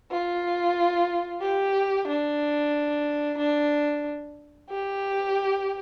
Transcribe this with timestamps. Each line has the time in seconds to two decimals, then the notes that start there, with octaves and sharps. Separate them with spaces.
0.11 F4
1.42 G4
2.08 D4
3.39 D4
4.70 G4